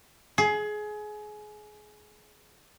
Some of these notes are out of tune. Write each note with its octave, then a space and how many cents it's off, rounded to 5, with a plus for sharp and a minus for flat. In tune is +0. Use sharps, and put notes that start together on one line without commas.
G#4 +25